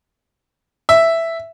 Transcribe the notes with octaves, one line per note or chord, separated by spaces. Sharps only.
E5